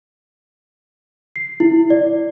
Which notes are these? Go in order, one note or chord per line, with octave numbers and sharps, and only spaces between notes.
C7
E4
D5